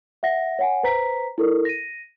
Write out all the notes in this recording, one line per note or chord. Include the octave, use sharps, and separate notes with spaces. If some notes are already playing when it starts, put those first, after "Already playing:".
E5 F#5 A#6
C#5 F#5 G#5
B4 C5 A#5 B6
E4 A4 A#4
A#6 D#7